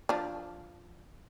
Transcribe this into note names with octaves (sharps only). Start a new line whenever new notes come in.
F3 D4